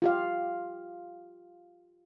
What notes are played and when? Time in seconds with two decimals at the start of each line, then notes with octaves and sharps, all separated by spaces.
0.02 F4 G4 F5